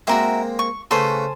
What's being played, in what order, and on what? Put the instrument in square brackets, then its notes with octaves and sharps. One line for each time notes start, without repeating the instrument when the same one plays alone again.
[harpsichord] G#3 A#3 C4 [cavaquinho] F#4 A#4 E5
[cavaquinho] C#6
[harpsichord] C#3 A3 B4 [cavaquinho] A4 C5 G#5